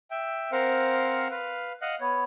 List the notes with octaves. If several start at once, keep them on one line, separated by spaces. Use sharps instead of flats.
E5 G5
C4 A#4 C5 F5 F#5
B4 F5
D#5 F5 F#5 F#6
B3 C#5